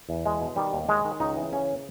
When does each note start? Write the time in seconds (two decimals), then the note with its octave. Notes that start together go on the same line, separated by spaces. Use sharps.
0.09 E2
0.25 B2 G#3
0.41 B2
0.56 D#3 G3
0.73 D#2
0.88 D#3 G#3
1.05 D#3
1.20 C#2 D#4
1.36 E3
1.52 C#3 C#4